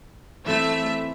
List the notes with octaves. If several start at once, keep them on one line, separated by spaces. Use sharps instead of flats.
E3 A3 C4 E5